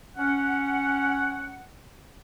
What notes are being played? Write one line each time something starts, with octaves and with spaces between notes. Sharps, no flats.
C#4 F#5